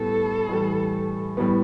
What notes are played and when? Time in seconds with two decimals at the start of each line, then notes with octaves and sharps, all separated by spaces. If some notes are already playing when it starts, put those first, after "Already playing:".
Already playing: A2 G3 B3 A4
0.49 A2 E3 G3
1.37 A2 G3 B3